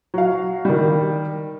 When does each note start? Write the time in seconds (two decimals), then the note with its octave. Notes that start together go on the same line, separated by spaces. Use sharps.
0.14 F#3 F5
0.65 D#3 G3